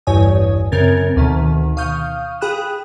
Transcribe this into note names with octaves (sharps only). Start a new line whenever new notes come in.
A1 E2 G2 C#5 G#5 D#6
F#2 C#3 C4 A#4 G#6 A6
D2 B2 D#3
F5 C#6 D#6 F6 G6
G#4 G5 B5 D#6 F#6 E7